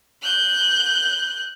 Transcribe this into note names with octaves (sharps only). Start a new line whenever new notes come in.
F#6 G6